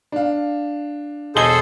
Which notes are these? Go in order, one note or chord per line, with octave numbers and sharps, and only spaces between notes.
D4 F5
E1 G#4 A4 C5 D#5 G7